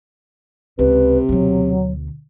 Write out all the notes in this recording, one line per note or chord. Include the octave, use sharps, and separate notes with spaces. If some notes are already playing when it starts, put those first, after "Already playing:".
C#2 C3 B4
D2 B2 F#3